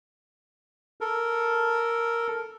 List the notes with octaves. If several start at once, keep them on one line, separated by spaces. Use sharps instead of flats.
A4 A#4